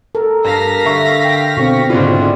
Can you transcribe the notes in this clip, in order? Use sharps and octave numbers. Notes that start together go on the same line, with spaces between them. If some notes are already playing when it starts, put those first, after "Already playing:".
A4 A#4
G2 F5 A#6 B6
D3 E5 C#6
G5
B2 D3 C4 C#6
G#2 C#3 C#4 E4 F4 D5